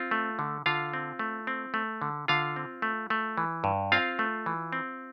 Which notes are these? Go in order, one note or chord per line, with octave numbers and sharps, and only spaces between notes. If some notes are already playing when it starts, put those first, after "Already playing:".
Already playing: C4 F4
A3
D3
D3 F4 F5
C4
A3
C4
A3
D3
D3 F4 F5
C4
A3
A3
E3
G2
C4 F4 F5
A3
E3
C4